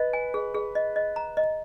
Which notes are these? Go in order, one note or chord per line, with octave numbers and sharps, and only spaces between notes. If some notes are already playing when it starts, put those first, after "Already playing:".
Already playing: B4 D#5
G#5
G#4
G#4
D#5
D#5
A#5
D#5